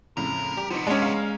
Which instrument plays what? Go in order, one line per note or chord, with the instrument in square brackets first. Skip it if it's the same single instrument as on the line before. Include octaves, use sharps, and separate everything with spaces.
[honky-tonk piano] F2 A2 C#3 [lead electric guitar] A#4
[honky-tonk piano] G3 G4
[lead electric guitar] C3 B3 [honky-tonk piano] F3 D#4
[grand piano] G#3 C#4 [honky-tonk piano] D4
[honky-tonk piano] F5 A#5